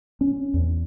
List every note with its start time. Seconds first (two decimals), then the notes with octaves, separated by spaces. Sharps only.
0.21 C#4
0.54 E2